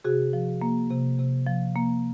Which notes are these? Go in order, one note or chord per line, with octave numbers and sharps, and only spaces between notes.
C3 F#4 G#4
F3
A#3
C3
C3
F3
A#3